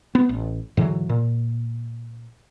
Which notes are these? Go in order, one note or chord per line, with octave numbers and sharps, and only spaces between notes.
B3
A1
G#2 D3 E3 F#3
A#2